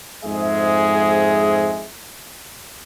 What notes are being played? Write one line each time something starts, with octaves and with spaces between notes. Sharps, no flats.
F2 G#2 G#3 G#4 E5